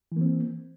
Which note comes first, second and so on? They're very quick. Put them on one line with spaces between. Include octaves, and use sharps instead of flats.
E3 A#3 C4